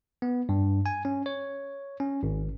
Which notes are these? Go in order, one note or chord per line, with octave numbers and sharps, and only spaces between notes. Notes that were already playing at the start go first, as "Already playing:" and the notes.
B3
G2
G#5
C#4
C#5
C#4
G#1